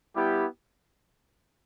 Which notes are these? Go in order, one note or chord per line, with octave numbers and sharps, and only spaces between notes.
G3 B3 E4 G4